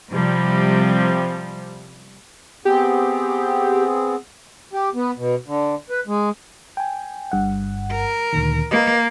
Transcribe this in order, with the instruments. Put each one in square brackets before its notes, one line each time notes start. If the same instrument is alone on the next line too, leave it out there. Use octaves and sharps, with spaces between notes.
[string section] C3 F3 G3
[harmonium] B3 C4 G#4 [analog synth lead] G4
[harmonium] G4
B3
B2
D3
B4
G#3
[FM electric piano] G5 G#5
G1 G2 F#5
[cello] A#4
[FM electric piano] D2 A#2 D#3
[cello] A#3 [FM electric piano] B4 D#5